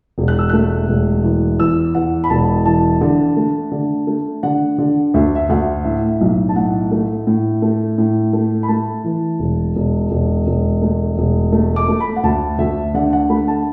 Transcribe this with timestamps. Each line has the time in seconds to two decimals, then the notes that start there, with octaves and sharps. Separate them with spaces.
0.18 E1
0.28 F#6
0.39 E6
0.50 A3 F#6
0.88 E1
1.24 E3
1.59 E2 E6
1.95 E2 F#5
2.24 B5
2.30 E1 A5
2.65 E3 A5
3.01 D3
3.37 A3
3.72 D3
4.07 A3
4.43 D3 F#5
4.78 D3
5.14 D2 E5
5.35 E5
5.49 D2 F#5
5.85 A2 E5
6.21 B1
6.49 A5
6.56 A2 F#5
6.92 A3
7.27 A2
7.62 A3
7.98 A2
8.33 A3
8.63 B5
8.68 A3 A5
9.04 E3
9.39 E1
9.76 E1
10.11 E1
10.47 E1
10.82 A3
11.18 E1
11.52 A3
11.76 D6
11.88 A3
12.01 B5
12.16 F#5
12.23 D2 A5
12.58 D2 E5
12.94 D3 F#5
13.13 F#5
13.30 A3 B5
13.48 A5